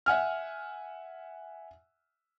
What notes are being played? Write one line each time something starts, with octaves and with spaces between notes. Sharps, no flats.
E5 F#5 G#5 F6